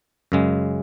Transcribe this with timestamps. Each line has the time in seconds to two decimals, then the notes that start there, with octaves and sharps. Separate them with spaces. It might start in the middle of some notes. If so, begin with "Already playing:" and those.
0.32 F#2 C#3 G#3